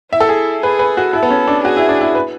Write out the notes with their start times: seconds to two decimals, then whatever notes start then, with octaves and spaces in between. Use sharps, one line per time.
0.12 E4 E5
0.20 A4
0.29 G#4
0.63 G#4 B4
0.79 B4
0.97 F#4
1.13 E4 A4
1.23 B3
1.30 C#4
1.48 D4
1.64 F#4 G#4
1.77 E4
1.89 D4
2.01 E4
2.15 B4